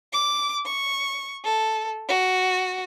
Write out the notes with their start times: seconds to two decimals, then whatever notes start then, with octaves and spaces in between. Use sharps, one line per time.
0.13 D6
0.65 C#6
1.44 A4
2.08 F#4